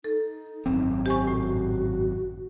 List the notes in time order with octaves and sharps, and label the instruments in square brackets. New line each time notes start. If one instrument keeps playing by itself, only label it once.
[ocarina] D#4 [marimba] A4
[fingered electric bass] G#1 F#2 C4
[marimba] G4 G#5 C#6 [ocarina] C5
[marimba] A2 [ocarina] F#4